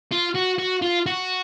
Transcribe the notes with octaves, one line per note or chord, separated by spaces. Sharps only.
F4
F#4
F#4
F4
F#4